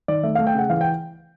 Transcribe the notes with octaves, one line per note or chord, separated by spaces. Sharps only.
D#3 D5
A3 E5
A3 F5
G5
C#3 F#5
E3 F5
G5